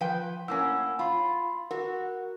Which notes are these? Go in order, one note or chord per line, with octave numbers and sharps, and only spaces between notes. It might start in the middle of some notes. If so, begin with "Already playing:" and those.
F3 B4 G5
A2 A#3 C#4 F#5 E6
F4 B5 C6
F#4 A#4